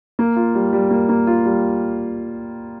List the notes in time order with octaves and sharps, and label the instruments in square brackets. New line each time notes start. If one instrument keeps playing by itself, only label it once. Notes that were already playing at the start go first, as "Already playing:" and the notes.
[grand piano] A#3
F4
G3
G3
A#3
A#3
F4
G3